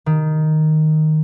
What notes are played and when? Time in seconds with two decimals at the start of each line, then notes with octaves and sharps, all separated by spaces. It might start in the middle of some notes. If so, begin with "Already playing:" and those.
0.06 D#3